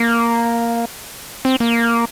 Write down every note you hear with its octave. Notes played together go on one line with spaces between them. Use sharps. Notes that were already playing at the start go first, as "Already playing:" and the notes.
Already playing: A#3
C4
A#3